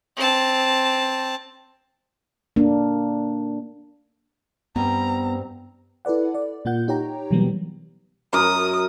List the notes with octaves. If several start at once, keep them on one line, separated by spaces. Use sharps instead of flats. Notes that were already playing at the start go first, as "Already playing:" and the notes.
C4 A5
A#3 D4
G2 G3 B3 C4 A#5
E4 A4 B4 D5 F#5
D5
A#2 A#3 F4 F#5 G6
D#4 G4 C#5 G5 A#5
B2 E3 F#3 G3 A#3 B3
F#2 A#4 D#6